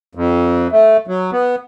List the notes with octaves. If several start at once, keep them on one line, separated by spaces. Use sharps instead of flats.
F2
A3
F#3
B3